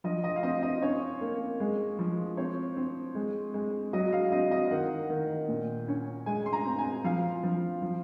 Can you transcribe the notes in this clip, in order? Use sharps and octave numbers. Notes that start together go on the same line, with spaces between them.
F3 D#5
D#5
F5
C4 D#5
D#5
C#4 C#5
A#3
G#3
F3
C4 C#5
C4
G#3
G#3
F#3 D#5
F5
C4 D#5
D#5
D#3 F#5
D#3
A#2
C#4
G#3 G#5
C6
A#5
C4
G#5
F3 F5
F3
F3